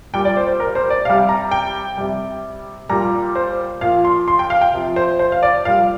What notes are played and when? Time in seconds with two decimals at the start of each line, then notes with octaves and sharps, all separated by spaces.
0.13 A#2 G3 G5
0.25 D5
0.37 C5
0.48 C5
0.60 A#4
0.75 C5
0.90 D5
1.05 C3 G3 F5
1.29 A#5
1.51 G5
1.97 C3 G3
2.89 A#2 G3 A#5
3.35 C5
3.81 A#2 F3 F5
4.05 C6
4.28 C6
4.39 G5
4.50 F5
4.61 G5
4.73 C3 F3
4.96 C5
5.19 C5
5.32 F5
5.43 D5
5.65 A#2 G3 F5